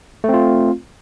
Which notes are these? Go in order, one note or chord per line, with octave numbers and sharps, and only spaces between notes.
A3 C4 F4